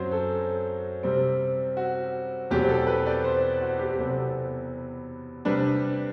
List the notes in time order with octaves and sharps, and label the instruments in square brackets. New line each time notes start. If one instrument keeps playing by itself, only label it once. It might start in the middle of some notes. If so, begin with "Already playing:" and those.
Already playing: [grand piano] F#2 F#3 C4 C5
A4
C3 G3 C4
F#4
E2 B2 F#3 C4 G4
A4
B4
D5
C5
F#4
G4
E2 C3 F#3 B3 A4
C3 G3 D4 B4